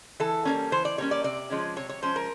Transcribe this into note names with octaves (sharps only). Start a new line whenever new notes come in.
E3 A4
G3 A#3 C#4
E3 C5
D5
G3 A#3 C#4 C#5
D5
C3 D5
F3 G#3 C#4
C3 C#5
C#5
F3 G#3 C#4 C5
A#4